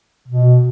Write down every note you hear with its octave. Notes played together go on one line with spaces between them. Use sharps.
B2